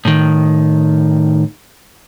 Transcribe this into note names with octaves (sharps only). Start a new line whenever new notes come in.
A2 D#3